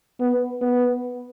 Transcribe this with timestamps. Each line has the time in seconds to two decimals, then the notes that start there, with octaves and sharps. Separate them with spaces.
0.20 B3
0.62 B3